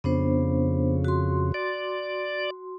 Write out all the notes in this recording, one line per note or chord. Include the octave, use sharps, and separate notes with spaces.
F2 C#3 B3 D4 C5
F#4 C6
D5